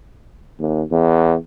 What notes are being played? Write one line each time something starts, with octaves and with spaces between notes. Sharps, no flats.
D#2
E2